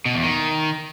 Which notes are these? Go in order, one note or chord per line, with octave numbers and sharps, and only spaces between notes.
B2
E2
D#3